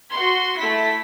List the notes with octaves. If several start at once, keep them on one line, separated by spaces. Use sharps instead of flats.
F#4 C6
A3 E4 B6